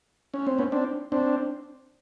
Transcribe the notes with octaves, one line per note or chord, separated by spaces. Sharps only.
C#4
C4
B3 C#4
C4 D4
C4 D4